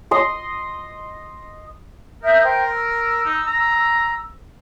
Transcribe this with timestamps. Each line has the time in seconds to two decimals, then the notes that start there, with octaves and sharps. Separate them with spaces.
0.11 D#5 C6
2.23 A#4 E5 D#6 G6
2.43 C5 G5
2.72 E6
3.25 D#4
3.47 A#5